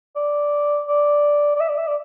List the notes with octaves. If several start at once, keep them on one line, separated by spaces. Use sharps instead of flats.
D5
D5
D5
E5
D5
E5
D5